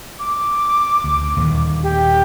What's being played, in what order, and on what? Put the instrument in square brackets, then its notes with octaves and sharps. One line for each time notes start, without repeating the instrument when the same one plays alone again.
[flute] D6
[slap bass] D2
D#2 A#2 D#3
[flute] G4